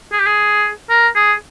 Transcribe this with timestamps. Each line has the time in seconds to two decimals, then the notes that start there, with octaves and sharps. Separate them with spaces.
0.12 G#4
0.20 G4
0.26 G#4
0.90 A#4
1.16 G#4